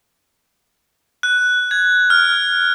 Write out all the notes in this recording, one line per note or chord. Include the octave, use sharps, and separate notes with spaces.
F#6
G#6
F6